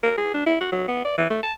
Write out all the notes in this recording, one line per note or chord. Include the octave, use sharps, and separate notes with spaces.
A#4
G#4
D4
E4
F#4
F#3
B3
D5
E3
A3
A5